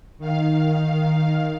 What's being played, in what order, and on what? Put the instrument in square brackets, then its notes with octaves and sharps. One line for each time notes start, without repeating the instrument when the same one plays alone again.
[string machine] D#3 F5